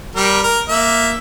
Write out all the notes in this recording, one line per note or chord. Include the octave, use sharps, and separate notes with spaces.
G3 A#4
A#4
A#3 E5